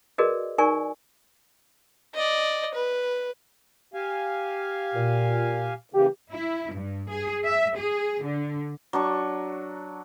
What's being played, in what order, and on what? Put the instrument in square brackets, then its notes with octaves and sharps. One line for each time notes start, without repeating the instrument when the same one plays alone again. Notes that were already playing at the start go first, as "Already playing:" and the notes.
[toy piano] F#4 G#4 A#4 B4 D5 D#5
D#4 A#4 D5 G#5 C#6
[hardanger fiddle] D5 D#5
B4
[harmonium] G4 F5 G#5
[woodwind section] A#2
[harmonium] C#3 E3 A#3 [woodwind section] G4
[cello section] E4
G2
G#4
E5
G#4
D3
[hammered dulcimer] F#3 D4 C#6